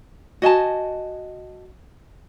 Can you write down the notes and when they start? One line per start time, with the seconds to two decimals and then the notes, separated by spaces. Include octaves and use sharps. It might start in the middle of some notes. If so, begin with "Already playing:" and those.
0.42 F#4 D#5 G#5 A5